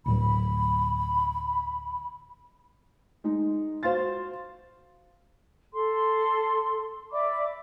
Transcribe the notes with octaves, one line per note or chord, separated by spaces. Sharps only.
D2 A2 F#3 B5
G#3 D#4
F#4 C5 F5 C6 A6
A4 C6
D5 E5 B5 D6